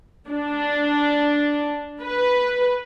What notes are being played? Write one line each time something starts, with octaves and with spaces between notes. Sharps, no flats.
D4
B4